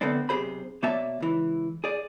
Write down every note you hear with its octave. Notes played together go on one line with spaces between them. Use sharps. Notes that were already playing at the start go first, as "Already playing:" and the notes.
D3 A3 B3 C4 D4
B1 C3 G4 G#4 C5 B5
B2 A#3 C#5 D5 E5 A5
C#2 E3
G#4 D5